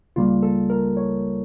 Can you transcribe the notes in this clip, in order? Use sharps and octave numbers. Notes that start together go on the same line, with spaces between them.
C#2 C#3 G3 A#3 F4
A4
A#4
C#5